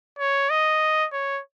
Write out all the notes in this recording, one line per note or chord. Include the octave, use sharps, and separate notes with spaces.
C#5
D#5
C#5